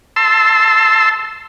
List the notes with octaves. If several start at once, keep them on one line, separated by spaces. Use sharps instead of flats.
A5 C6 E6